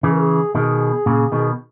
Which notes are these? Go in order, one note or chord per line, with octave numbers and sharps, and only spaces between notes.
C#3 E3 G#4
A#4
G#4
B2 D#3 G#4
A#2 C#3
B2 D#3